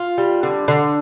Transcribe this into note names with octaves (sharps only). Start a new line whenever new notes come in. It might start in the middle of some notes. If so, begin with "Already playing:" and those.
Already playing: F4
G3
D3
D3